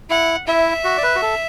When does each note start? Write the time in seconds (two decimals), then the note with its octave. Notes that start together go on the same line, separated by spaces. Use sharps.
0.10 E4 F#5
0.47 E4 E5
0.84 F#4
0.97 D5
1.03 B4
1.15 F#4
1.22 A4